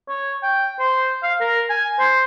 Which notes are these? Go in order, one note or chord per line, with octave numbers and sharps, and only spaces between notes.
C#5
G5
C5
F5
A#4
G#5
C5